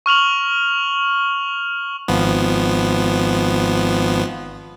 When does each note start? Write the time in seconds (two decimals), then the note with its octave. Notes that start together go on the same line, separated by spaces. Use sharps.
0.06 C#6 F6 F7 F#7
2.08 G#1 F3 B3